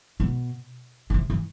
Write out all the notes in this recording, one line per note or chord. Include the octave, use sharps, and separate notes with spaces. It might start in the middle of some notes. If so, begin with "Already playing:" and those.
B2
B2
C3
E3